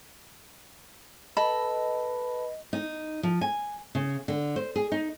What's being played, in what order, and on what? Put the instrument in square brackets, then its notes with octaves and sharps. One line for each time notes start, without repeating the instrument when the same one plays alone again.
[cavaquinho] A4 [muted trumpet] B4 [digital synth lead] D#5 [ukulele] B5
[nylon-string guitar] D#4
F3
G#5
C#3
D3
C5
G#4
D#4